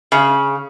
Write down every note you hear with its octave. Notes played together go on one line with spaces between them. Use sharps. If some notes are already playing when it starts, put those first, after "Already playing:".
C#3